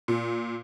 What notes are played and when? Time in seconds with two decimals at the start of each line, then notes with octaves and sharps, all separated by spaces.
0.08 A#2